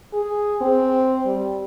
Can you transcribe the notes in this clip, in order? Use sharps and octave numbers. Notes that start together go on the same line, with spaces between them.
G#4
C4
G3